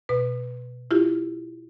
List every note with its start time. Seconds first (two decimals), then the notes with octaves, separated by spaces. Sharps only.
0.09 B2 B4
0.91 E4 F4 G4